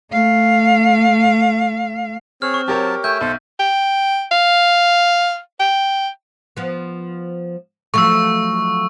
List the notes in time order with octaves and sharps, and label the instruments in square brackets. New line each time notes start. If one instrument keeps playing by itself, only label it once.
[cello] A3 F5
[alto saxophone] C4 [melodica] G#4 C#5 [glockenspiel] F6
[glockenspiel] C#6
[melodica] F#3 A5 [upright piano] G4 A#4 C#5
[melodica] A3 G5 G#5 [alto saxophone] E5 [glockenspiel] G6
[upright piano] B1 [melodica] A4 C5
[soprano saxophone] G5
F5
G5
[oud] F3 B3
[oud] F3 F#3 A3 [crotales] C#6 E6